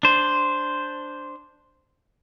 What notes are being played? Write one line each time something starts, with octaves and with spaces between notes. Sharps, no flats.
D4 C5